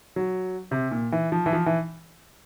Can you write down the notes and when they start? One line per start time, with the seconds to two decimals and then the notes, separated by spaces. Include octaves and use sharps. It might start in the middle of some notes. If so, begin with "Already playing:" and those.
0.16 F#3
0.71 C3
0.91 A#2
1.12 E3
1.32 F3
1.46 E3
1.53 F3
1.66 E3